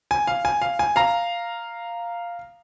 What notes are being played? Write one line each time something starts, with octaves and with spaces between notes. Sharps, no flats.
G#5
F5
G#5
F5
G#5
F5 A#5